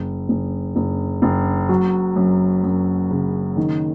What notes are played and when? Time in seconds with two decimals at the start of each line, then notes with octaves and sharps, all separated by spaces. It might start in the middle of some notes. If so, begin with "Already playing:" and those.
Already playing: F#1
0.29 F#1
0.76 F#1
1.22 F#1
1.69 F#3
2.16 F#2
2.64 F#2
3.11 C#3
3.57 D#3